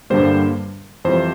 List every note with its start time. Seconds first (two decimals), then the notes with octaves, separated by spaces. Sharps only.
0.10 G2 D3 G3 A#3 C5
1.05 F2 E3 G3 C5